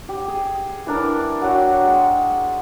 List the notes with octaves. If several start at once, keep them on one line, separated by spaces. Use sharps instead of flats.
G4
G#4
E3 D4 A#4
F#3 F#4 G5
G#3